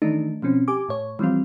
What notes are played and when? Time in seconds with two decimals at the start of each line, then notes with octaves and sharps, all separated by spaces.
0.02 D#3 E3 A3 D4 D#4
0.42 B2 F3 C4 C#4
0.68 G4 G#5 D6
0.89 A2 C#5
1.19 E3 F3 G3 C4 F4